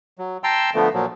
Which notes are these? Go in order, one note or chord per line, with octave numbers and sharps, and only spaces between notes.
F#3
G5 A5 A#5 C6 E6
D3 F3 A3 B3
A#2 F3 F#3